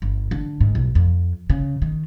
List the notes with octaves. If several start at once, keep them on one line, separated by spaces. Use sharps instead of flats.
G1
D3
G#2
B1
F2
C#3
D#3